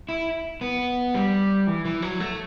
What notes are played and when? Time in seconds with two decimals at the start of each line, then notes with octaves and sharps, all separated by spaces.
0.09 E4
0.61 B3
1.14 G3
1.67 E3
1.85 E3
2.02 F#3
2.20 A3